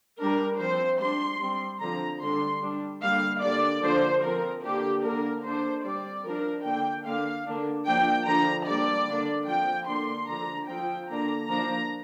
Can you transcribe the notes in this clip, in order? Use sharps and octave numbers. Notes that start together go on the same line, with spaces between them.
G3 D4 A#4
F3 C4 C5
G3 D4 C6
G3 C4
D3 F3 C4 A#5
D3 G3 D4 C6
G3 D4
D3 G3 A#3 F5
D3 G3 A#3 D4 D5
D3 F3 A#3 D4 C5
F3 C4 A#4
D3 A#3 D4 G4
D3 A#3 D4 A#4
D3 A#3 D4 C5
G3 C4 D5
F3 D4 A#4
D3 A#3 D4 G5
D3 A#3 D4 F5
D3 A#3 D4
F3 A#3 D4 G5
D3 F3 D4 A#5
D3 G3 A#3 D4 D5
D3 A#3 D4
F3 C4 G5
D3 A#3 D4 C6
D3 F3 D4 A#5
F3 C4 G5
D3 A#3 D4 A#5
F3 A#3 D4 A#5